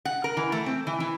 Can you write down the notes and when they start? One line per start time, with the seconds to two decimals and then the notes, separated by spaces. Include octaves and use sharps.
0.05 F#5
0.24 A#4
0.37 E3
0.52 A3
0.66 C4
0.87 E3
1.00 E3